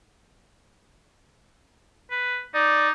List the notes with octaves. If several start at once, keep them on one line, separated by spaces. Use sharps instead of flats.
B4
D#4 D5